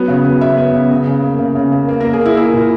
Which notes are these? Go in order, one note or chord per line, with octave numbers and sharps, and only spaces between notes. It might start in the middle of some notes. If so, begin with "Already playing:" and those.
Already playing: F#3 B3
C#3
B3
B3 E5
B3
C#3
C#3
C#3
A#3
C#3
C#3
A#3
A#3
A#4
A#3
G#4
A#3 E4
A#3 E4
A#2